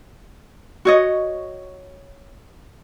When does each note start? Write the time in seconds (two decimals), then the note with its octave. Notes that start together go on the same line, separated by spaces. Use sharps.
0.85 F#4 C#5 D#5